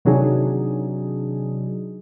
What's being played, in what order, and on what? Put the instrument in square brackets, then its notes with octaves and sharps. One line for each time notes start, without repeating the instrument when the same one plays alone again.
[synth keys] C3 D#3 F#3 D4 D#4 G#4